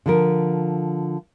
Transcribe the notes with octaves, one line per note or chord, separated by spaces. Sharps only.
D3 F3 A#4